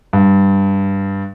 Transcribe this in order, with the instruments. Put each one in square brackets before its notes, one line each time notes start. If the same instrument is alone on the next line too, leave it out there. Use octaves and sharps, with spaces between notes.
[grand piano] G2